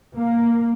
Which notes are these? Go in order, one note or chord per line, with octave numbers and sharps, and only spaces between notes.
A#3